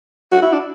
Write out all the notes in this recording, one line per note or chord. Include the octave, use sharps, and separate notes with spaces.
F#4
E4
D4